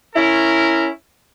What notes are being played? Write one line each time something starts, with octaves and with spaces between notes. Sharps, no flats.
C#4 E4 A#4